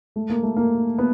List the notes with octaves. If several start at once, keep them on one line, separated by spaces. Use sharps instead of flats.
A3
A#3
A3
A#3
B3